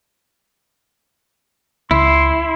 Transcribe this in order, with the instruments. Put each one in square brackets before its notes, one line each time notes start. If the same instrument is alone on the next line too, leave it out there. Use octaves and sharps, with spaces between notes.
[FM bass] C#2 [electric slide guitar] E4 [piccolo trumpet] C6